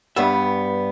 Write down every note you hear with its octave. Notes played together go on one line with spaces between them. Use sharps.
G2 G3 B3 E5